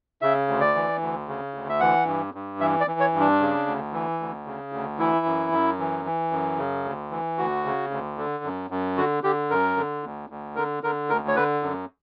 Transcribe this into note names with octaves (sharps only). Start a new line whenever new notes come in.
C#3 E5
D2
D5
E3
D2
C#3
D2
E5
E3 F#5
G2
G2
E3 E5
D5
E3
C#5
G2
D4
C#3
D2
E3
D2
C#3
D2
E3 E4
F#2
F#2
E3
E3
F#2
C#3
D2
E3
D2 F#4
C#3
D2
D3
F#2
F#2
D3 F#4
D3 G4
F#2 A#4
D3
D2
D2
D3 A#4
D3 A#4
D2 A#4
C#5
D3 B4
F#2